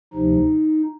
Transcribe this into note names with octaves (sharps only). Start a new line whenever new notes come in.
D2 C3 F3 D#4